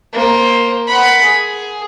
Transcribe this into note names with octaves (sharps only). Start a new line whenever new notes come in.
A#3 C5
F#5 B5
G#4